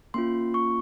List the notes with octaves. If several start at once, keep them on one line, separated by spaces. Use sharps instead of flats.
A#3 C#4 F4 C6
C#6